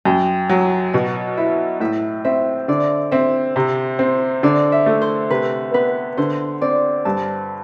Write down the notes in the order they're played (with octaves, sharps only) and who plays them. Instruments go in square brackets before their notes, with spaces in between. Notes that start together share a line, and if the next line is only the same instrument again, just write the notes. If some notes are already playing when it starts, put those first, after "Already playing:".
[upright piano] F#2 [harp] G5
[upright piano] F#3
[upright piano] B2 [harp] F#5
[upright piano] E4 [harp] E5
[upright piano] A2 [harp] E5
[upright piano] C4 [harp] E5
[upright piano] D3 [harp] D5
[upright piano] C4 [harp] E5
[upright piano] C3
C4
[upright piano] D3 [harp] D5
[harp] E5
[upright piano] A3
[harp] C5
[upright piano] C3 [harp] B4
[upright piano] B3 [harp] B4
[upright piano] D3 [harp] C5
[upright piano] C4 [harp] D5
[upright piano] G2 [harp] A5